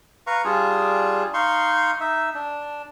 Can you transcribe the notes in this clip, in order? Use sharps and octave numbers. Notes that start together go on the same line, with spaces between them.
B4 F5 A#5 C#6
G3 D4 F4 G#4
D#4 F5 C6 C#6
D#4 E5
D4